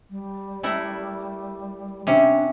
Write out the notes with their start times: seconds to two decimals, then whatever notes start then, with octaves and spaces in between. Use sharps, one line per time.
0.11 G3
0.63 A3 E4 A#4
2.07 C3 C#4 D4